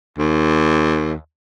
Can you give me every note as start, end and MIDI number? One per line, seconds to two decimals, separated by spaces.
0.18 1.13 39